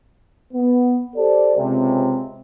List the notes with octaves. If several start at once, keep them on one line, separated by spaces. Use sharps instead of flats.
B3
G4 A4 C5 D5
C#2 C3